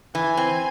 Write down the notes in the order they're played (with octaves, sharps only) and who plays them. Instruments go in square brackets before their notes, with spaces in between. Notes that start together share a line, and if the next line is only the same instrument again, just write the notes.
[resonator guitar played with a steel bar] E3 [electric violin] G#5
[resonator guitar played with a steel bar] C4